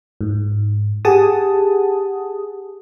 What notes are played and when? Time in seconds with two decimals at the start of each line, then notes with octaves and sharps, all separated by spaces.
0.21 G#2
1.05 G4 G#4 F#5 G#5 A5 D#6